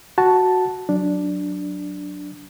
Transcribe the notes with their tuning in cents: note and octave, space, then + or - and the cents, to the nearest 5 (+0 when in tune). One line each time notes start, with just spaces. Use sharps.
F#4 +0 A5 +0
F#3 +0 D4 +0